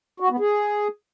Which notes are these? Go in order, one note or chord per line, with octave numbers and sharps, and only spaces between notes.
F#4
B3
G#4